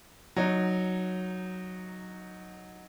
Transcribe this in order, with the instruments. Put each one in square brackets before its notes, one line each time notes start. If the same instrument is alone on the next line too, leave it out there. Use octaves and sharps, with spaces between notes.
[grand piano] F#3 D#4